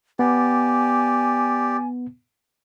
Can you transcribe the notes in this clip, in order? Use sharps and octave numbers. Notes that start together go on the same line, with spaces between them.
B3 G4 D5 G#5